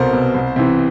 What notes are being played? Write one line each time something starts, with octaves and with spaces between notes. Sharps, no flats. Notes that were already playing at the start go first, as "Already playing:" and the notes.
Already playing: C2 B2 A4 A#4 C5
B2
C2
C3 E3